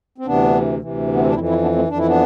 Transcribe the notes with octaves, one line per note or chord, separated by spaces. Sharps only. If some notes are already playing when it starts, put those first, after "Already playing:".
C4
D2 C3 E3 B3 D4
D2 C3 E3
B3
C4
D4
F2 E3 C4 E4
C4 E4
B3 D4
A3 C4
F2 E3 D4
E4
B3 D4